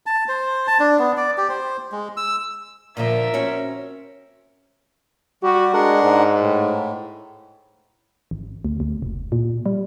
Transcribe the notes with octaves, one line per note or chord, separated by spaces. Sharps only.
A5
C5
A5
D4
B3
D5
G4
C5
G#3
E6
A#2 D3 F3 A#4 E5
C4 C#4 F#4
G3 F#4 G4
G#3 D4 A#4 F#5
G#2
A2
G#1
D2
D2
F1
A#2
G3